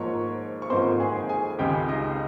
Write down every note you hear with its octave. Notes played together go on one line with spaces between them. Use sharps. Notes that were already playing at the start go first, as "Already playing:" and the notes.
Already playing: G#2 F3 A#3 C#5 C#6
C#6
G#2 F3 A#3 C5 C6
G#4 G#5
G#4 G#5
C#2 C#3 G#3 G4 G5
D#4 D#5